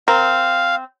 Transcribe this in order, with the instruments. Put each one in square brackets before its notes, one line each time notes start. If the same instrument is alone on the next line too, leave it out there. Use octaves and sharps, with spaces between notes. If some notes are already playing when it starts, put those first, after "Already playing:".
[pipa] C4 [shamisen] A#4 [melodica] F5